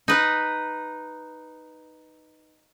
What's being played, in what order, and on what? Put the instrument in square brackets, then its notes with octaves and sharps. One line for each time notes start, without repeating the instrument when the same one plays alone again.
[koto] D#4 B4